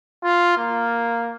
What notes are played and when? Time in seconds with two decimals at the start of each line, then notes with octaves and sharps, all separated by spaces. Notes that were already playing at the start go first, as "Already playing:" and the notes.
0.24 F4
0.57 A#3